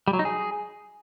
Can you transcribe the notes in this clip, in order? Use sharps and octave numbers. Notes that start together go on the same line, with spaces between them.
G3
F#3
D#4
G#4